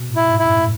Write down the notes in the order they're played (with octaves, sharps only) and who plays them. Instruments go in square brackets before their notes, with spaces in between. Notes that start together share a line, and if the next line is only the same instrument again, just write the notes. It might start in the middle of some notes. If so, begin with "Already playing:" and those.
Already playing: [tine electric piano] B2
A2
[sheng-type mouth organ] E4
[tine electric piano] G#2
[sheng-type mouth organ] E4
[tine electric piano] F#2
A2